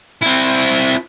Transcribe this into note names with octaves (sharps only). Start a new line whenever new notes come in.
C4 E4